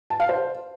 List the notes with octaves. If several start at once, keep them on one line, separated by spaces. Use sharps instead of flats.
A5
F5
C5